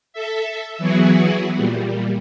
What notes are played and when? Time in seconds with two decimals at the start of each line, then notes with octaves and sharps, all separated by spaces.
0.13 A4 E5
0.78 E3 F#3 B3 E4 F#4 G#4
1.53 A#2 G3